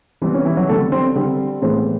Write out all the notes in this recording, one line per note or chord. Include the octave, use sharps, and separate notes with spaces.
E3 G3 B3 C4
C#4
E3 E4
F#3 F#4
D3 G3 A3 C4 A4
C4 C5
D3 G3 C4
A2 E3 G#3 B3 C4 C5